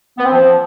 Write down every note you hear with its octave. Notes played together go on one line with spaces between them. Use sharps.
B3
C4
F3